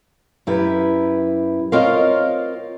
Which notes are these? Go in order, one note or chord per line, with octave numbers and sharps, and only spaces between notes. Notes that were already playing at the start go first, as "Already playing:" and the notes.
F#2 E4 G4 B4
C4 F4 A#4 C#5 D#5 F5